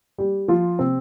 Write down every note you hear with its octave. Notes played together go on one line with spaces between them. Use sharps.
G3 G4
F3 F4
C3 C4